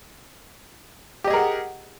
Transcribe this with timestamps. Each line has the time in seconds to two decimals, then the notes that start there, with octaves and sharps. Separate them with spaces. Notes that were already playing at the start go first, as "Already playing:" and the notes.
1.24 G4
1.27 D#5
1.30 G#4
1.33 A#4
1.36 F#5